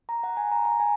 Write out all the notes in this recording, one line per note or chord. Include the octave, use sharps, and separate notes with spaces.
A#5
F#5
G#5
A#5
A#5
G#5